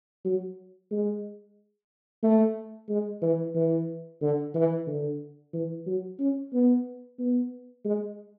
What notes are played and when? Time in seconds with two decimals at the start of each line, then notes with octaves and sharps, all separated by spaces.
0.25 F#3
0.91 G#3
2.23 A3
2.89 G#3
3.22 E3
3.55 E3
4.22 D3
4.55 E3
4.87 D3
5.53 E3
5.87 F#3
6.19 C#4
6.53 B3
7.19 B3
7.85 G#3